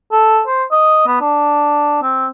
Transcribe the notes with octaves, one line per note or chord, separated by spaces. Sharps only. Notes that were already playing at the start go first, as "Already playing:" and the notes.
A4
C5
D#5
B3
D4
C4